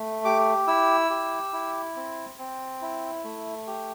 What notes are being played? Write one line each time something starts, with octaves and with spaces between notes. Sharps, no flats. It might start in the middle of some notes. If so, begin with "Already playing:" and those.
Already playing: A3
G4 D6
E4 E6
G4
E4
C4
C4
E4
A3
G4